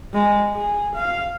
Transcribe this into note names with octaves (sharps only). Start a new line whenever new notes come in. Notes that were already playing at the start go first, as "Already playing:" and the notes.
G#3
G#4
F5